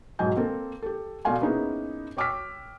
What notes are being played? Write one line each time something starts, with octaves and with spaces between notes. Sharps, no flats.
B1 G#2 F#3 D#5 G#5 G6
A#3 C4 A4
G4 A4
B2 A3 D5 F5 G#5 C6
A#3 B3 C#4 D#4 E4 G#4
C#5 G5 D6 E6 F6 B6